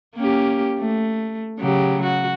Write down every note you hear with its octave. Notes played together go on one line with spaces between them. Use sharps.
A#3 C#4 G4
A3
C#3 F#3 G4
F#4